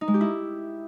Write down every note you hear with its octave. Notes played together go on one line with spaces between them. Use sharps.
D#4
G#3
G4
E4